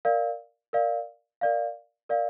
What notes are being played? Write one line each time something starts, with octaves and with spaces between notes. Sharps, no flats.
A#4 D5 F5
A#4 D5 F5
A#4 D5 F5
A#4 D5 F5